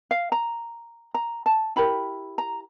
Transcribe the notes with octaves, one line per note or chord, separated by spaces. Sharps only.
F5
A#5
A#5
A5
E4 G4 A#4 B5
A#5